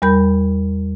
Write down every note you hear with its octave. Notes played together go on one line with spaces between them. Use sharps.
E2 G3 A#4 B5 G6